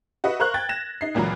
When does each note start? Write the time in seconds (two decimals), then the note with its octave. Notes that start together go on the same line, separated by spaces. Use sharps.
0.24 F#4 B4 D#5 E5 F#5
0.40 A#4 C5 F5 A#5 C#6 F#6
0.54 G5 G#6 A6
0.69 A#6 E7
1.01 D#4 C7
1.15 C#2 A#2 E3 F#3 A#5